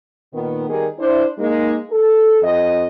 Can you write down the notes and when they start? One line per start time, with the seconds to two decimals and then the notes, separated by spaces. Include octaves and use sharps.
0.32 A#2 D#3 B3
0.68 D#3 G3 B3 G4 G#4 A#4
0.98 D4 E4 C5
1.38 G#3 A#3 D#4
1.90 A4
2.41 F2 D#5